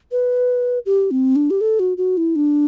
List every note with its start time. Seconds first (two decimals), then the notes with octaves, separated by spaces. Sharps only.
0.11 B4
0.86 G4
1.11 C4
1.36 D4
1.50 G4
1.61 A4
1.80 F#4
1.98 F#4
2.17 E4
2.36 D4